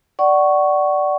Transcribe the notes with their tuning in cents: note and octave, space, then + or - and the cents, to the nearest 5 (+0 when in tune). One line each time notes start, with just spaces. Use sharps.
D5 +0 F#5 +25 C#6 +0